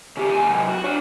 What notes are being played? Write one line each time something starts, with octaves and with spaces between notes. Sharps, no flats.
C#3 G4
D#2 G#5
C3 F#3
F#4
D4 C#5